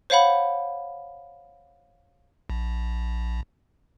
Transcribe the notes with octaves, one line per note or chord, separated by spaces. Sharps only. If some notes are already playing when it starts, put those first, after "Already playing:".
C5 C#5 F5 F#5 B5
A#1